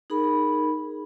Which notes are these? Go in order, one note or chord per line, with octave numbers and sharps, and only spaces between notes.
D#4 G#4 A#4 B5